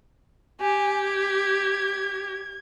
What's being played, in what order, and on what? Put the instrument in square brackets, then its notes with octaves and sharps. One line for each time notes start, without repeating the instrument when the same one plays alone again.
[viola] G4 [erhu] G#5
[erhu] G#6